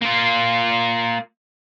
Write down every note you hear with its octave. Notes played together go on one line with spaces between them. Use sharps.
A#3 F4